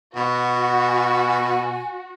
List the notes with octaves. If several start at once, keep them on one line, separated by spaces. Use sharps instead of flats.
B2 F#4
G#5